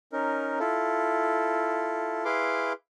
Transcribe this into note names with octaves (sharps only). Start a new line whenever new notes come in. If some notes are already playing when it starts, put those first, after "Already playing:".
C#4 D#4 A#4
E4 F4 A4
E4 G#4 B4 F5 C6 D6